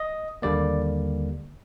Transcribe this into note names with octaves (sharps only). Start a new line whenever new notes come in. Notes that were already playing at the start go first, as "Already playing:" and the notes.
Already playing: D#5
D#2 D3 G3 A#3 D5